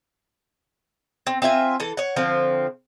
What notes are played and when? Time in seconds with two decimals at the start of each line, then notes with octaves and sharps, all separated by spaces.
1.27 C4
1.42 C4 F4 E5 G#5
1.80 E3 A4
1.97 C#5 F#5
2.16 D3 F3 C4